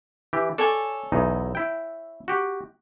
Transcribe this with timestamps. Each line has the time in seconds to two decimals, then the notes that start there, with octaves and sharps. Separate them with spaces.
0.33 E3 G4
0.58 A4 C#5 D5 G#5
1.12 B1 E2 D#4
1.55 E4 G5
2.28 F#4 G4